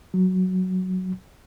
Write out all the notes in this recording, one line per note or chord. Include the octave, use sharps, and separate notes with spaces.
F#3